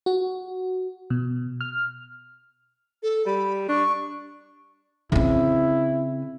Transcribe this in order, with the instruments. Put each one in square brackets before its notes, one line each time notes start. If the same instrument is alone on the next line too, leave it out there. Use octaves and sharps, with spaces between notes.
[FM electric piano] F#4
B2
F6
[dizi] A4
[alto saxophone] G3 [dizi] B5
[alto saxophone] D4 [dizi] C#6
[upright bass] C#3 C4 [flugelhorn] E4